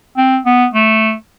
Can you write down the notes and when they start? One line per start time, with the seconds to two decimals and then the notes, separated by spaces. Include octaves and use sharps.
0.17 C4
0.46 B3
0.74 A3